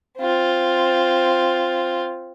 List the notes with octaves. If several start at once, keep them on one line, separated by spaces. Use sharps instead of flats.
C4 F4